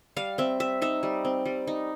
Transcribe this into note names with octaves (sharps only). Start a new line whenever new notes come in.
G3 F5
C4 E5
G3 E5
D#4 E5
G3
C4
G3
D#4